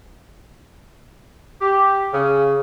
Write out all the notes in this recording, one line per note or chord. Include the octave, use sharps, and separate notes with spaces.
G4
C#3